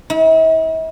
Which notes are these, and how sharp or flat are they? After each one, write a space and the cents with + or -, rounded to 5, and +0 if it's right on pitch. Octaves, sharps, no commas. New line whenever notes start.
E4 -45